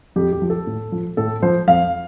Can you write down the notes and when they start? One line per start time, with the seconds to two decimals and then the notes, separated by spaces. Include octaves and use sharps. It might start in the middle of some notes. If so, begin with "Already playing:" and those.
0.16 F2 G4
0.33 G4
0.42 F3
0.50 A4
0.67 A2
0.92 F3
1.17 A2 A4
1.42 F3 C5
1.68 F2 F5